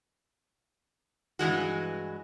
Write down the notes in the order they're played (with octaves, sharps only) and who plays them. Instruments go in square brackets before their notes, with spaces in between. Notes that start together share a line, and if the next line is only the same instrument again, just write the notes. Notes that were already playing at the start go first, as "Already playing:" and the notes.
[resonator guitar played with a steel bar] G2 E3 G#3 F#4